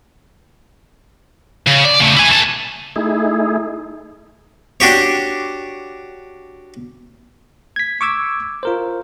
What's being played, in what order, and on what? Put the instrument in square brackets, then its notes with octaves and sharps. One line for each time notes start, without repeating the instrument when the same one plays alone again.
[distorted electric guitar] C#3
D5
C#3 A3
E4 G#5
A#3 A5
[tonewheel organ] A3 D#4 E4 G#4
[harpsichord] D4 F#4 G4 C#5
[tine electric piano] G#6 B6
C#6 D6 E6 G#6
F4 A#4 C5